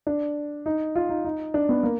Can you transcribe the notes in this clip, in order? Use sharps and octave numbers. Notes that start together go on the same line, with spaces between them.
D4
D#4
F4
D#4
D#4
D4
B3
A#3